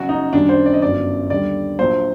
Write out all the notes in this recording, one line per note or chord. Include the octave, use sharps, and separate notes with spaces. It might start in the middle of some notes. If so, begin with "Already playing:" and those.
Already playing: F#1 F#2 F#3 F#4
D#4
F#2 D#3 G3 D4
C5
D5
D#5
G1 F#2 F#3 D5
D#2 D3 G3 D5
A#1 A#2 F#3 C5